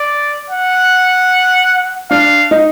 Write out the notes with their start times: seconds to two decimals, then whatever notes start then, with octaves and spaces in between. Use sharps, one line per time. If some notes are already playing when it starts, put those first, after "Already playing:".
Already playing: D5
0.50 F#5
2.10 D4 F5
2.51 D#4